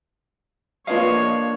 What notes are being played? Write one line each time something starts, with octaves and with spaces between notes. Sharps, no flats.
A#3 D4 F4 B4 C#5 D#5 F5